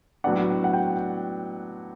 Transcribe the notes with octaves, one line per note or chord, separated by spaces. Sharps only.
A2 F#3 B3 D4 F#5
F#5
G5